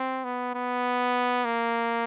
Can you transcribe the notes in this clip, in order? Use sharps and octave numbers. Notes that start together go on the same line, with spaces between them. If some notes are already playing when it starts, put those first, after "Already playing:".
Already playing: C4
B3
B3
A#3